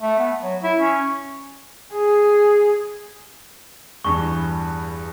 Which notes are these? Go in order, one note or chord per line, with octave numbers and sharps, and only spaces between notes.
A3
B3
F#3
E4
C#4
G#4
E2 G2 E3 C#6